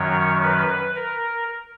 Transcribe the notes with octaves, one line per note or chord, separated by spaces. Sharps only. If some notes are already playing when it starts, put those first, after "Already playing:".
Already playing: F#2 D#3 F#3 C#5
B4
A#4